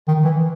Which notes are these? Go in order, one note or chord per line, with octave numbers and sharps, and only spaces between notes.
D#3
E3